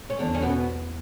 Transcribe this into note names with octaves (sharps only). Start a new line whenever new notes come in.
C#4
E2 D3 D4
C#4
B2 B3